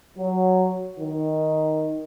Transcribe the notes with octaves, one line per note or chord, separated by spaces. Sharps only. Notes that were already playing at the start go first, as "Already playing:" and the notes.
F#3
D#3